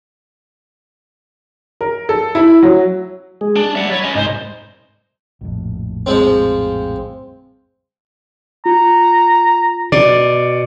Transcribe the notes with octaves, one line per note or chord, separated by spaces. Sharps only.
A#4
A4
E4
F#3
G#3 G#4
D4
G3 D5 E5 F#5
F#3 C#5 B5 A6
C#4 D#5
C2 G#2 C5 D#5
A#1 F2 A2
F3 G#3 C4
F4 A#5
B2 D5